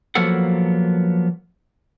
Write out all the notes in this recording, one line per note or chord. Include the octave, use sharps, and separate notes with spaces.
F3 F#3 A#3 B3 A4 F#5